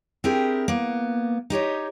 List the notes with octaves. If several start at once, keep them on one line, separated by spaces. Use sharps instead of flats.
C4 D4 E4 G4 G#4 A#4
A#3 B3
D#4 G4 C#5 D#5